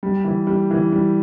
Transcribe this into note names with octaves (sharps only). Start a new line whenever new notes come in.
G3
E3
G3
E3
G3